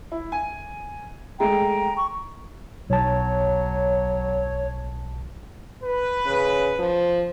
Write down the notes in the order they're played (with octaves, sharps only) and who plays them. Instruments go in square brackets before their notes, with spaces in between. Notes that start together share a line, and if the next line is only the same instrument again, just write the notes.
[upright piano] E4
G#5
[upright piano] G#3 A3 [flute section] G5 A#5
[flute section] C#6
[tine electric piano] B1 A5 [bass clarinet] F#3 [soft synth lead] C#5
[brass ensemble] B4
[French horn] C#3
F3